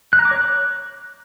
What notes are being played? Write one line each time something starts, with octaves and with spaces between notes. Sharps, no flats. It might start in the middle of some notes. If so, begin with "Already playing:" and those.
F#6
A#5
D6
C#5
F#6